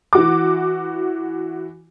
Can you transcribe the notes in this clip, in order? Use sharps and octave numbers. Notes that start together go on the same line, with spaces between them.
E3 F#4 D6